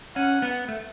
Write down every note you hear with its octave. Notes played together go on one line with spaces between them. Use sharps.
C#4 F#5
B3
A3